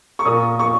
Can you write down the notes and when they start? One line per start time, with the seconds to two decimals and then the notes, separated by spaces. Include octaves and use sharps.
0.19 C#6
0.25 A#2 A#3 D#6
0.59 C#6